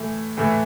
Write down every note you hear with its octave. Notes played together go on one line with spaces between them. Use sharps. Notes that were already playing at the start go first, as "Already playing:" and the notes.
Already playing: A2 E3 A3
A2 E3 A3